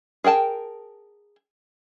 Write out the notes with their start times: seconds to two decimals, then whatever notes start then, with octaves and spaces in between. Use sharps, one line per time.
0.24 G#4 A#4 G5 A5